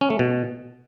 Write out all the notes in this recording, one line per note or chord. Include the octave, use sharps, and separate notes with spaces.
C#4
A3
B2